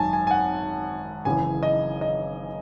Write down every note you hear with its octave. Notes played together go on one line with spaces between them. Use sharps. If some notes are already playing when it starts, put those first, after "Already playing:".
Already playing: G#1 F#2 D#3 G#5 A5
G#5
G#5
F#5
F#1 F#2 C#3 E3 G#5
D#5
D#5